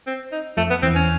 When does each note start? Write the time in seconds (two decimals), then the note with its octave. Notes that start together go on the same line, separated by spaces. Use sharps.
0.07 C4
0.32 D#4
0.57 F2 F3 A3
0.70 B3
0.83 E2 E3 C4
0.95 C#4